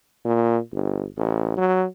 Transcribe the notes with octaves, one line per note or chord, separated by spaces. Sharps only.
A#2
G1
A1
F#3